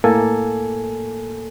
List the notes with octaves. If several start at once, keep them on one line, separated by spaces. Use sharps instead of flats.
A2 A#3 A4 G#5